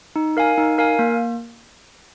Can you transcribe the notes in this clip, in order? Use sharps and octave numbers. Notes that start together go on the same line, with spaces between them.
D#4
A#4 F5 G#5
D#4
A#4 F5 G#5
A#3